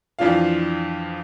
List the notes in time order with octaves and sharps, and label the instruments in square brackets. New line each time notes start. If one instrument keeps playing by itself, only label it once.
[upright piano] F2 E3 F3 D4 F4 F5